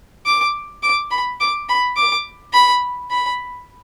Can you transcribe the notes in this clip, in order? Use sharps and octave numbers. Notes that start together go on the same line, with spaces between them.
D6
D6
B5
D6
B5
D6
B5
B5